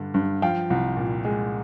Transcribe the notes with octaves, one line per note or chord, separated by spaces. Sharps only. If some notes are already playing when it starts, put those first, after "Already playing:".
Already playing: G2 D3
G2
F3 F5 G5
C2
A#2
G#3